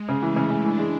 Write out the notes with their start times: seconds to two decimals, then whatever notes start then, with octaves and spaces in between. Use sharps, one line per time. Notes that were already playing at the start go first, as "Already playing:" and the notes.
Already playing: G#3
0.09 C#3
0.22 E3 A3
0.36 C#3
0.50 C#3
0.65 E3 D4
0.79 G#3